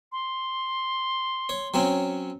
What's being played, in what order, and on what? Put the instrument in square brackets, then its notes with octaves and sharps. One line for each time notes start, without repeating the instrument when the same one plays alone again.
[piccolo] C6
[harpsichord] C#5
F#3 C4 C#4